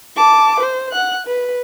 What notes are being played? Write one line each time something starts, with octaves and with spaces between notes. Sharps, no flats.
A5 D6
C5
F#5 F#6
B4